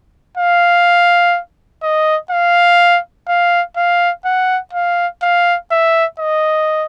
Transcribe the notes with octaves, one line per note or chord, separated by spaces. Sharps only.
F5
D#5
F5
F5
F5
F#5
F5
F5
E5
D#5